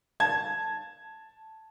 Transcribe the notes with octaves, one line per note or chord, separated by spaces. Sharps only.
A5 G#6